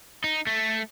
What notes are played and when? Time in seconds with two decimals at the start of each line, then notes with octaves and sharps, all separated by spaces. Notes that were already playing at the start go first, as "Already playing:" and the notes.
0.24 D#4
0.47 A3